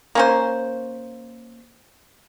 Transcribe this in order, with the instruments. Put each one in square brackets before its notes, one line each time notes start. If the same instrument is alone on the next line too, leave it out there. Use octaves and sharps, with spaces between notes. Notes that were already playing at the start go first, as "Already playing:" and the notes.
[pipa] A#3 C#4 C5